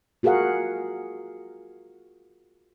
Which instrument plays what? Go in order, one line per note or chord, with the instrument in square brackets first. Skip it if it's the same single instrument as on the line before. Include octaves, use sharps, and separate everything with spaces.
[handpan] F4 F#4 G#4 A#4 F5 F#5